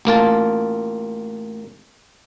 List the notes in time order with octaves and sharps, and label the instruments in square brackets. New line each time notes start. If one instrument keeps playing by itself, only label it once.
[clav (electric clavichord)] A1 A#3 F4 A5